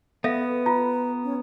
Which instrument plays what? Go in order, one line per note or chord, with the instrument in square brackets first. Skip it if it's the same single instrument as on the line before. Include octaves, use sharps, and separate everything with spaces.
[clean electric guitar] B3 [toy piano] A4 E5 F5 [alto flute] B4
[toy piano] F4 [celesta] A#5
[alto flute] C#4